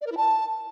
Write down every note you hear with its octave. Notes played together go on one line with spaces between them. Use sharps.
D5
A#4
E4
A5